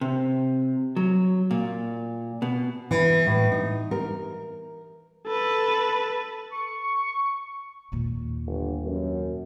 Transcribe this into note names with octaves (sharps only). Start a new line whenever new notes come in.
C3
F#3
A#2
B2
E3
A2
D#4
A#4
A4 B4
C#6
D#2 A#2
G1
F#2